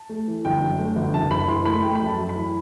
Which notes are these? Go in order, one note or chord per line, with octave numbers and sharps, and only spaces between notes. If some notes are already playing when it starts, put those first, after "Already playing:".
Already playing: A5
A3
E3
G1 G5
F#2
A3
G1
F#1 A5
F#1 B5
E3 C6
A3 B5
A3 G5
B5
F#2
A5
F#2
B5
E3